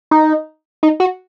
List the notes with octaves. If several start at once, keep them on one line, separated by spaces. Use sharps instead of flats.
D#4
D#4
F#4